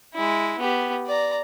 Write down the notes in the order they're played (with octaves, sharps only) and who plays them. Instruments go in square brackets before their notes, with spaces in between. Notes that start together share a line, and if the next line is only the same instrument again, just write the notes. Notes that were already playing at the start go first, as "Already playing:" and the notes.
[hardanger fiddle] G#3 E4
B3 G4
D5 A#5